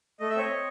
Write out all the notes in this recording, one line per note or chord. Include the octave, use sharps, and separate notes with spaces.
A3 D#5
E5
C4 C#5 D#5
C4